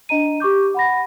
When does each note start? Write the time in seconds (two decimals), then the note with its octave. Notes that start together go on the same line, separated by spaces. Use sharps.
0.09 D4 D#5 A#5 D#7
0.40 G4 C#6 D6 G6
0.74 F#5 B5 A#6